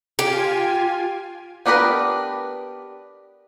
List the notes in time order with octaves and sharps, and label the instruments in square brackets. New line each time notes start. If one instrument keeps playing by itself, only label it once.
[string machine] F4 G#5 [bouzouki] G4
[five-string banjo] B3 D4 G4 A#4 B4